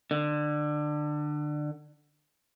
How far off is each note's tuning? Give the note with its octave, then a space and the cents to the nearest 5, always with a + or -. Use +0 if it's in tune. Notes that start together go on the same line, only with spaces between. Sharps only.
D3 +25